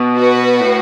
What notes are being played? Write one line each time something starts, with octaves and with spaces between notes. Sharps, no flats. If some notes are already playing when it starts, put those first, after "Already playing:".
Already playing: B2
F#4 B4
A2